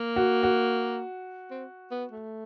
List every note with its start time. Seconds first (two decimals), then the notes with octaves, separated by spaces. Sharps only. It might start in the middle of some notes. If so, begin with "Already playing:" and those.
Already playing: A#3
0.16 F#4
0.43 F#4
1.51 C4
1.91 B3
2.12 A3